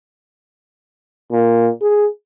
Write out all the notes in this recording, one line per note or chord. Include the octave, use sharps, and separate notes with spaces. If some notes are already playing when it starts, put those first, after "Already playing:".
A#2
G#4